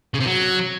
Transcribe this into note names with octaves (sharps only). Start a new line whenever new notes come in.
C#3
C3
F#3